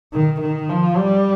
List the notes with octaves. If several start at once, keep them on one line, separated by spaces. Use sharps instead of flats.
D#3
D#3
F3
G3